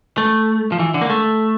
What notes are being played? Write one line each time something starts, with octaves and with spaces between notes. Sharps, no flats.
A3
F3
E3
D3
A#3
A3